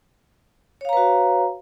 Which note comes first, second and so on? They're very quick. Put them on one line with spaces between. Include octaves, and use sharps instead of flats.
C#5 F5 A#5 B4 F#4